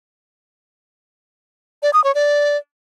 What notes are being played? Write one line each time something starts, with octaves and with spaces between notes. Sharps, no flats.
D5
D#6
C#5
D5